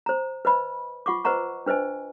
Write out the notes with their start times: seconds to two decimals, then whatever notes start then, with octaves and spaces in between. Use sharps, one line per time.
0.06 C5 A#5
0.45 B4 C5 D#5 B5
1.06 F4 F#5 C#6 D6
1.25 B4 C5 D#5 F#5 A#5 C#6
1.66 D4 B4 C5 D#5 G#5